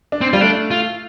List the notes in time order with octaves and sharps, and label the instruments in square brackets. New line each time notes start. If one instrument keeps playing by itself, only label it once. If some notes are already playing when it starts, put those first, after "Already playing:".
[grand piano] D4
[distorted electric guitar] C4
[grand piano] G3 [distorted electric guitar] F4
[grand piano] A3 [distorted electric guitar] D4
[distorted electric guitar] F4